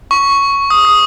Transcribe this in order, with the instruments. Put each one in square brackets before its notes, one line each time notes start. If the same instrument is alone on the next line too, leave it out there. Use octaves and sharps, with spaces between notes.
[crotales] C#6
D#6
D#6